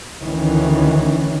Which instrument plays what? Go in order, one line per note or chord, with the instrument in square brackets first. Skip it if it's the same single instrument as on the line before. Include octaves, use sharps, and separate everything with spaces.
[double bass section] D2 D#3 E3 C#4